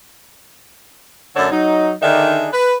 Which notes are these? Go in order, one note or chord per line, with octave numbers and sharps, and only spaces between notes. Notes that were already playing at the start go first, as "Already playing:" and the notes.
F#2 D3 A3 A4 C#5 D5
F#3 D#4
D3 D#3 D4 D#4 G#4 E5
B4